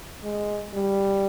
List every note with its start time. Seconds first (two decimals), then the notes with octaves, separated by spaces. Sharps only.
0.23 G#3
0.73 G3